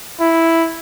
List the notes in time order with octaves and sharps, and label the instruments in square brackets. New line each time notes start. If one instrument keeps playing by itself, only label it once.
[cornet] E4